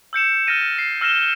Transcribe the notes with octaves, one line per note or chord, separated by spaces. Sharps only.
E6 G6 C#7 E7
F6 A6 A#6 D#7
C7
E6 F6 A#6 E7 G7